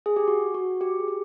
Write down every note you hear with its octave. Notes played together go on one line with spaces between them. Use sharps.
G#4
G4
F#4
F#4
G4
G#4
G4